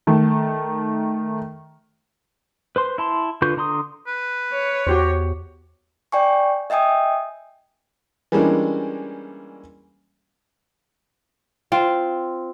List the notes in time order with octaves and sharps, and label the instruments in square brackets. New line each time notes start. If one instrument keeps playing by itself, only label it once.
[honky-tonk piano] D#3 A3
[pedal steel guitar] B4 C5 C6
E4 A5 C6
D3 F4 B4 C#6 G6
D3 A#5 C6 D#6
[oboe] B4
[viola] C#5
[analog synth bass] E2 [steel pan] F#4 G4 C5
[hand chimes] D5 G5 G#5 C#6
D#5 E5 G5 G#5 D#6
[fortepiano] E3 G3 G#3 A#3 C#4 D4
[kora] C4 F4